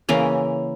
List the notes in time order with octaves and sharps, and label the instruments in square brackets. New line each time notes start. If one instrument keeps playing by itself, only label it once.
[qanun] C#3 E3 A#3 A#4